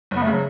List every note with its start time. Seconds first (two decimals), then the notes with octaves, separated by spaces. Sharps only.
0.11 F#1
0.16 B3
0.23 C#3 A3
0.33 F#3